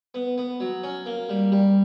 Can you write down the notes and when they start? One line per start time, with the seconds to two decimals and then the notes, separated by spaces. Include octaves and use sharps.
0.14 B3
0.38 B3
0.60 F#3
0.84 C#4
1.06 A#3
1.29 G3
1.52 G3